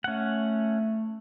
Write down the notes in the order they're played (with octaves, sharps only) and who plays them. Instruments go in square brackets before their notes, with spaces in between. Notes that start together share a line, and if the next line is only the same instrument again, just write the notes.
[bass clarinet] A3 [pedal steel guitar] C#4 F#5